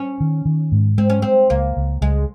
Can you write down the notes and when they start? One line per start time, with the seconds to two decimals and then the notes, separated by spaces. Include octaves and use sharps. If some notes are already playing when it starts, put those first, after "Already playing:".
Already playing: C#4
0.20 D#3
0.45 D#3
0.72 G#2
0.98 G#3 C4
1.10 C#4
1.22 G#3 C4
1.50 C#2 A#3
1.77 C#2
2.01 C#2 G#3